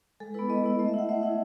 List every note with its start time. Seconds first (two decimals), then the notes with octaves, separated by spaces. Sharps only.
0.20 G#3 A4
0.34 B3 E4 B4
0.49 G#3 D#5
0.64 B3 E4
0.79 A3 D#5
0.88 E5
0.94 E4 F#5
1.09 A3 E5
1.23 E4